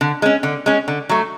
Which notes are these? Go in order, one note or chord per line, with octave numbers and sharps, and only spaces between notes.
D3
G#3 C#4
D3
G#3 C#4
D3
F#3 A3